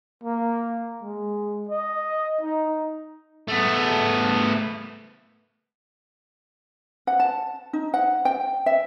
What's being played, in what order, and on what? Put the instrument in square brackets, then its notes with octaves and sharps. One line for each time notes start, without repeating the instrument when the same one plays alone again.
[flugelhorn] A#3
G#3
D#5
D#4
[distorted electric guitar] A3 B3
[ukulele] F#5
A5
D#4
F#5
G5
E5